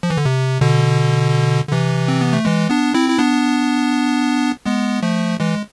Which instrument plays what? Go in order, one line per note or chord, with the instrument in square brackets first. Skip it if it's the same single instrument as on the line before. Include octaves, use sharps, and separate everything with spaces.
[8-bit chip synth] F3
E3
D3
C3
B2 D3
D3
C3 E3
C4
B3
A3
E3 G#3
B3 D4
C4 E4
E4
B3 D4
G#3 B3
F3 A3
E3 G#3